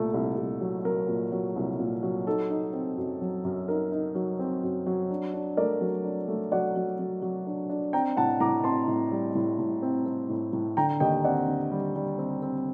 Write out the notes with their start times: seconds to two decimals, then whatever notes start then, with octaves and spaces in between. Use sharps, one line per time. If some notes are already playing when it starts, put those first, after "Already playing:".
Already playing: C2 A#2 A3
0.14 C2
0.38 C2
0.61 F#3
0.85 F#3 A#4
1.08 A#2
1.32 F#3
1.56 C2
1.79 A#2
2.03 F#3
2.27 D#4 A4
2.50 D#4
2.73 C4
2.97 F#2
3.21 F#3
3.45 F#2
3.68 D#4 A#4
3.92 D#4
4.15 F#3
4.39 C4
4.63 F#2
4.86 F#3
5.11 D4
5.34 D4
5.57 A3 A#4 D5
5.81 F#3
6.04 D4
6.28 A3
6.52 F#3 D5 F#5
6.76 F#3
6.99 F#3
7.22 F#3
7.47 D4
7.70 D4
7.93 C4 G5 A#5
8.17 A2 F#5 A5
8.40 A2 A#5 D6
8.64 C4 A5 C6
8.88 A2
9.12 G3
9.35 A2
9.59 A2
9.82 C4
10.06 C4
10.30 A2
10.53 A2
10.77 D3 G5 A#5
11.00 D#2 D#5 G5
11.24 C4 D5 F#5
11.48 D3
11.72 G3
11.95 G3
12.19 C4
12.42 C4